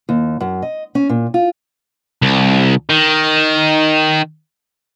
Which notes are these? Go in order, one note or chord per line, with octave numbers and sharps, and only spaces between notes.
D#2
F#2
D#5
C#4
A#2
F4
C2
D#3